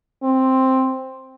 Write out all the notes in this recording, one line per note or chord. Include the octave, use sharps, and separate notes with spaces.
C4